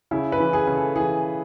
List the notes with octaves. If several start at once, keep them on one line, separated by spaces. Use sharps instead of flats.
C#3 E4
B4
E3
G#4
C#3
A4
E3 G#4